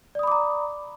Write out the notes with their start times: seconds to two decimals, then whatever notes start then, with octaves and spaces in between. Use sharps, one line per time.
0.15 D5
0.19 D#6
0.23 B5
0.27 D6
0.32 A#5